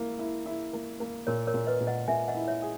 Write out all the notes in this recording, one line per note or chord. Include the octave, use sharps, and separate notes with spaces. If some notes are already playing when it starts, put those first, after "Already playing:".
Already playing: A#3 E4
E4
E4
A#3
A#3
A#2 A#4 C#5
A#4 C#5
A#2
B4 D#5
A#2
D#5 F#5
A#2 E5 G#5
D#5 F#5
E4
C#5 E5
G#4